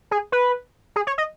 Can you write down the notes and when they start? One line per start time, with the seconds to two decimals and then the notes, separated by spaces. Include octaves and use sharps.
0.11 G#4
0.32 B4
0.96 G#4
1.07 C#5
1.18 D#5